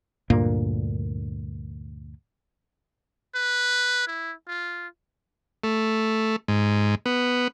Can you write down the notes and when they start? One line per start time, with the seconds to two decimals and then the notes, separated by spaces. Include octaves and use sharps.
0.30 D2 G2 A#2 A#3
3.35 B4
4.07 E4
4.48 F4
5.64 A3
6.48 G#2
7.06 B3